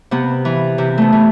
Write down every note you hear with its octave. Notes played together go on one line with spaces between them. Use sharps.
C3 B3
E3
C3
A3 B3
E3